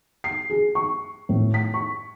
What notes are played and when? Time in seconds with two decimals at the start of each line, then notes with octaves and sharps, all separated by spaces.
0.24 C7
0.50 G#4
0.75 C#6
1.29 A2
1.54 B6
1.74 C#6